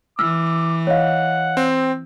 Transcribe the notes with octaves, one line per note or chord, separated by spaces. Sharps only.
E3 D6 E6 F6
C#5 D#5 F5 F#5
C4